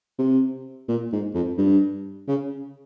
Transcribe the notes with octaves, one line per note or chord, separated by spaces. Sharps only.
C3
A#2
G#2
F2
G2
C#3